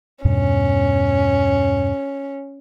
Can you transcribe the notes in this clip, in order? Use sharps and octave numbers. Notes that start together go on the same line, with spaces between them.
E2 G2 B2 C#4